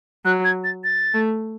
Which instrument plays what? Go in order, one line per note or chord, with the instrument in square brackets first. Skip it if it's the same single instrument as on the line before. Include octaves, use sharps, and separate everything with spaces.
[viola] F#3 [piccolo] F#6
[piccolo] G#6
A6
A6
[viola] A3